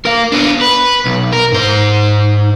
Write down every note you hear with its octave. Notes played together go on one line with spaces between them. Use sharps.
A#4 F5
B3 D4
B4
B1
A#4
G#2 C5